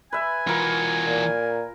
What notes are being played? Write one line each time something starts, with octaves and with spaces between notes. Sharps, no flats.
B4 E5 G#5
E3 F4 F#4 A#4
A#2